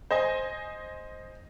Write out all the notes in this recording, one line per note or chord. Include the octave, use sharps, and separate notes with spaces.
C5 D#5 G#5